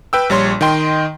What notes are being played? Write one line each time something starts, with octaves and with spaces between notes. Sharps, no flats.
B4 G5 E6
A#1 G3 C#5 C6
D#3 D#5 G5 C6